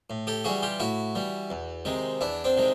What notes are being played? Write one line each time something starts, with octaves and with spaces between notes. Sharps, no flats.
A2
G4 A4
E3 G3 F#4 G#4
F4 G4
A2 E4 F#4
E3 G3
E2
C3 D#3 G#3
E2 D4 E4
C4 D4
C3 D#3 G#3